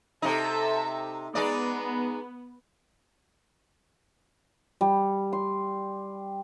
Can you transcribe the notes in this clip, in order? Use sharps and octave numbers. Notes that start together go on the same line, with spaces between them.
C3 D#4 A4 E5
G#3 B3 D#4 D5
G3
C6